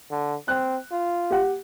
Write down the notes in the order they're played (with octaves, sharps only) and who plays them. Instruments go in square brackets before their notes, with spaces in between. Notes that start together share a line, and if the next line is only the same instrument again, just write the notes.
[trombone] D3
[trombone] C4 [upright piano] F#6
[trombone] F4
[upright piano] G4 F#5